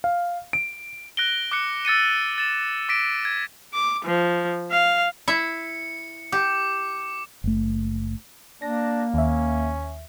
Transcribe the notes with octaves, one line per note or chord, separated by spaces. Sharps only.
F5
D7
F#6 A#6 D7 G7
D6 F#6 C#7
E6 A6 C#7 D#7
A6 E7
D6 A#6 B6 D7
G#6
D6
F3
F5
E4 E5 C#7
G4 D6
F#1 A3
A#3 D4 A#6
D#2 C#4 E5